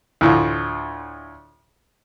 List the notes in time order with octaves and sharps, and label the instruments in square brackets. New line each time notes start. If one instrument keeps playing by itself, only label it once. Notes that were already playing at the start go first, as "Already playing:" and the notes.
[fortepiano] D2 A2 F4